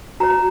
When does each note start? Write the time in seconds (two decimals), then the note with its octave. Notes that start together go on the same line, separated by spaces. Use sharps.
0.20 F#4 C#5 A#5